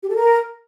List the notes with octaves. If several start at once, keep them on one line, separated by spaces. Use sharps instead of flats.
G4
A4
A#4